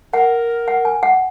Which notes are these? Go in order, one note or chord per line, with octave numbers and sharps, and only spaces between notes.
A#4 F#5
F#5
G#5
F#5